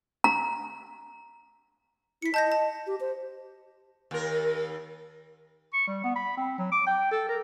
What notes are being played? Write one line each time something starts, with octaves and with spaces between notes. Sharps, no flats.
A#5
E4 B6 C#7
D#5 A5 G6 A#6
A5
G4
C5
D#2 A#4
C#6
G3
B3
B5
C4
F#3
D6
G5
A4
A#4